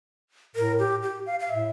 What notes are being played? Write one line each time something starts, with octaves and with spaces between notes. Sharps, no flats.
A2 A#4
G4
G4
F5
F5
A2 E5